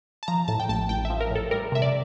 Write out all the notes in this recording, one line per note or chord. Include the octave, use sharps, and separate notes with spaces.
A5
F3 A#5
A2 A5
G5
A1 A5
A1 G5
E5
F3
A#4
A2 A4
G3 A#4
C3 E5
D5